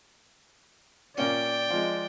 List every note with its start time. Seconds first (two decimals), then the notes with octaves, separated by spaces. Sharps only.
1.18 A#2 A#3 C#4 D5 G5
1.70 F3 G#3